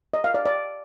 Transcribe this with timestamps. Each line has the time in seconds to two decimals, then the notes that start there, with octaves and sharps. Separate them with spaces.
0.14 D#5
0.24 F5
0.34 D5
0.46 D5